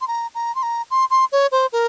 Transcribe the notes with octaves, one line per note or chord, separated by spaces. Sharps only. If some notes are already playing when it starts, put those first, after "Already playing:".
C6
A#5
A#5
C6
A#5
C6
C6
C#5
C5
A#4